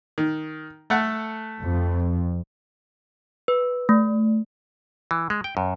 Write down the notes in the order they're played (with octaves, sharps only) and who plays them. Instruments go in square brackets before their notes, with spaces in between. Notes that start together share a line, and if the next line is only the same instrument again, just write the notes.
[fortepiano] D#3
A3 A4 F#5
[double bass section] F2
[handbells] B4
A3
[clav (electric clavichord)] E3
G#3
G5
F#2